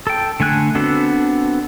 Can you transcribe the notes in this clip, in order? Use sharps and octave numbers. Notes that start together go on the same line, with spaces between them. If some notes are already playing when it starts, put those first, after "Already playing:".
A4 G5
D3 A3 G#5 F#6
B3 C4 D4 F#4 A4